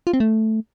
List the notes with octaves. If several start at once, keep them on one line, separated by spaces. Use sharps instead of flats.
F4
C4
A3